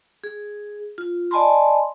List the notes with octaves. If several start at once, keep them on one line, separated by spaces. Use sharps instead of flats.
G#4
F4
D5 D#5 G#5 A5 B5 C6